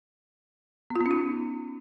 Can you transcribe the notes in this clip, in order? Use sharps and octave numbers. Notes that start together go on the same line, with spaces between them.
B3
F4
B3
C#4
D#4